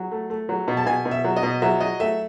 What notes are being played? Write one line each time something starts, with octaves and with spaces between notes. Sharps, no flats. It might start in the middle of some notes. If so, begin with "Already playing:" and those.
Already playing: F#3
A3
A3
F#3
B2
A5
B2 G#5
B2
E5
F#3
D#5
B2
F#3 E5
F#3 D#5
A3 E5